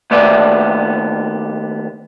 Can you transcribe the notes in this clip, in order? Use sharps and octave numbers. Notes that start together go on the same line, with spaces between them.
D#2 A3 B3 D5 E5 G#5